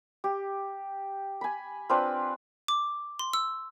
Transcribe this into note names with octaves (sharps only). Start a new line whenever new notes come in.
G4
G#5 B5
C4 D4 F4 B4
D6
C6
E6